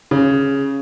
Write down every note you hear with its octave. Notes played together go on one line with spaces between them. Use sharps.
C#3